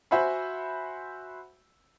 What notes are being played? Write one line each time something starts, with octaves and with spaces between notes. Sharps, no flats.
F#4 C5 E5 F#5 G#5 B5